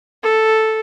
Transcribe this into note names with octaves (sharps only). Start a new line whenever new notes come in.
A4